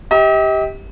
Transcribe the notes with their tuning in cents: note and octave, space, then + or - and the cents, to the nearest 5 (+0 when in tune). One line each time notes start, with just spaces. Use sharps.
G4 +0 D#5 +45